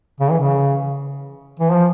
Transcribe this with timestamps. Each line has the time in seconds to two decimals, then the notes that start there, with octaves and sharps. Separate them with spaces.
0.20 C#3
0.30 E3
0.40 C#3
1.59 E3
1.72 F3